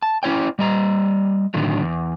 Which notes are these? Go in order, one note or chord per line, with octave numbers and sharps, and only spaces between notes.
A5
C#4 E4 C#5 G5
G3 D#5 A#5
A2 D3 D#3 F#3
E2